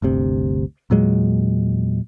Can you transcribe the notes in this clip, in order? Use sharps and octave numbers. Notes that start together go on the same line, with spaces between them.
G1 D2 C3
E2 A#2 F#3 G#3